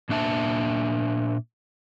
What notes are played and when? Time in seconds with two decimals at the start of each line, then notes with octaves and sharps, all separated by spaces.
0.09 A#2 A#3 D4 E5 A5